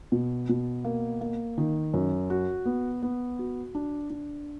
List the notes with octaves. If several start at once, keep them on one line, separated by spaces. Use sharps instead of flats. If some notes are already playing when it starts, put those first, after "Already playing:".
B2
B2
A#3
A#3
D#3
F#2
F#4
B3
B3
F#4
D4
D4